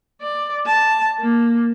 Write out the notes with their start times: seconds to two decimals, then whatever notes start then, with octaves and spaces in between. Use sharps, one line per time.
0.21 D5
0.67 A5
1.20 A#3